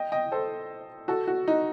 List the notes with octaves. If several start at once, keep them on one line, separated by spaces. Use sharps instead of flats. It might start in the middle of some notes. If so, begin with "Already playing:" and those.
Already playing: D#5 G5
D#5 G5
A4 C5
F#4 A4
F#4
D#4